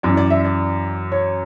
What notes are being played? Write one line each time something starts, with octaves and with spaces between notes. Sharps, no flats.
F#2 E3 D5
D5
E5
D5
C#5